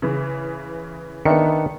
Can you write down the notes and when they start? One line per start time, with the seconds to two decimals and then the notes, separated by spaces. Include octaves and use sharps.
0.02 C#3 E3
1.25 D#3 B3 D4 E5 C#7